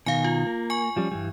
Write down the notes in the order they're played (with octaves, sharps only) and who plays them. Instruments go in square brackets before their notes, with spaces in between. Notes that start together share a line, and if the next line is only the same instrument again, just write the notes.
[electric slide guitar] B2 D#3 [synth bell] F5 G#5
[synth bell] F4
[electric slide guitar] A#3
[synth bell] G#5 C#6
[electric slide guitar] F3 G3 C#4
G2 E3 G3